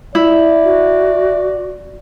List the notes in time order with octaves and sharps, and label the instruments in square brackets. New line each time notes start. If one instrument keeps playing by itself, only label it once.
[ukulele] E4 [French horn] D5
[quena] F#4